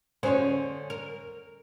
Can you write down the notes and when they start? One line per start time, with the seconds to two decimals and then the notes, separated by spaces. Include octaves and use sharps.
0.23 D3 C#4 G#4 C5 C#5
0.90 A#4